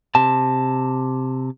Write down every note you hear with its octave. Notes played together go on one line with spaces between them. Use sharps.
C3 A5